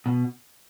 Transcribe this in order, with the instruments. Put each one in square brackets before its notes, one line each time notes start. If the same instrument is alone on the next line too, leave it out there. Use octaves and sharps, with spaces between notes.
[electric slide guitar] B2